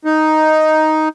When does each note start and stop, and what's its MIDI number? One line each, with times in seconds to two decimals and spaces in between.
0.05 1.09 63